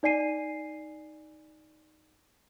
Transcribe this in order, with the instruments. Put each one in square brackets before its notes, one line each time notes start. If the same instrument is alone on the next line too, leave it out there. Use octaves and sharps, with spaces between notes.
[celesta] D#4 D5 G#5 C7 D#7